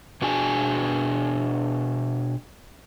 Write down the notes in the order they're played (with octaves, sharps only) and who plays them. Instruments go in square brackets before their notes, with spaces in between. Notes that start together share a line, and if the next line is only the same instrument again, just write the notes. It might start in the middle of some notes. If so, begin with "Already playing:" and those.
[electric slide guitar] B2 D4 F#4 G#4 G#5